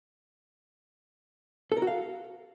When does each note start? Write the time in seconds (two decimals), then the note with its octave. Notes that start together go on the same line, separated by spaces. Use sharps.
1.72 A4
1.77 A#4
1.82 F#4
1.87 F5